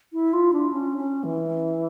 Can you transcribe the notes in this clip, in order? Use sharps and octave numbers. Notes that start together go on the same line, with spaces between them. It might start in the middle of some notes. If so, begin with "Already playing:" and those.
E4
F4
D4
C#4
C#4
E3